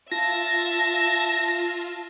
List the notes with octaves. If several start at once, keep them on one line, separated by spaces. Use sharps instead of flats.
F4 E5 A5 A#6